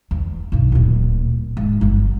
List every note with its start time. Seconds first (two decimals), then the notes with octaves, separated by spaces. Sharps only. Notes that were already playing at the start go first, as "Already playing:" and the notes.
0.11 E2
0.52 B1 G2
0.72 D1 A#2
1.57 G#2
1.81 G1 B3